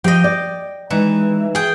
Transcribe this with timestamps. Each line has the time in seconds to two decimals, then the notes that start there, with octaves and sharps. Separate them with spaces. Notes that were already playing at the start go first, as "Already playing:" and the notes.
0.04 F3 G4 D#5 G5
0.24 D5
0.90 E3 G#3 D#4
1.55 G#4 G5